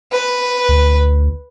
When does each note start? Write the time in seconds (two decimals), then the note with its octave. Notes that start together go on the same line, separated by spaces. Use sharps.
0.12 B4
0.69 D2